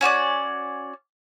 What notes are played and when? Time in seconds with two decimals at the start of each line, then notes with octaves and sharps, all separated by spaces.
0.01 C#4 F#4 C#5 D5